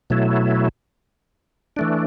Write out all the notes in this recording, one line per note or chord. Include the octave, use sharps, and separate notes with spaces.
B2 F#3 A3 E4
E3 A3 D4